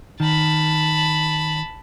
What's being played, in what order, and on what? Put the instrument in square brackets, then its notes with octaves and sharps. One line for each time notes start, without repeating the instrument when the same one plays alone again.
[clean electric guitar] D#3 [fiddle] A5 B5